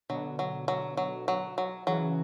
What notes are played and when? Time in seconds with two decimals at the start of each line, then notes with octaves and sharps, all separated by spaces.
0.09 B2 D3 F#3
0.39 F#3
0.68 F#3
0.97 F#3
1.28 F#3
1.58 F#3
1.87 C#3 E3 F#3